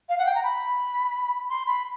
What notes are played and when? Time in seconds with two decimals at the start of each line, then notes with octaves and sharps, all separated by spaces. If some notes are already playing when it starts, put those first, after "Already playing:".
0.09 F5
0.18 F#5
0.26 G5
0.35 A#5
0.44 B5
1.50 C6
1.66 B5